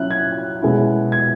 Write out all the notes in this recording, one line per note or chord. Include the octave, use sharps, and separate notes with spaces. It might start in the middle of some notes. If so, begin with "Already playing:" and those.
Already playing: F#3 C#4 E4 F#6
G#6
B2 G#3 C#4 E4
G#6